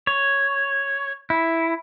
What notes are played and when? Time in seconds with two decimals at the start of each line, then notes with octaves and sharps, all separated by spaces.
0.07 C#5
1.30 E4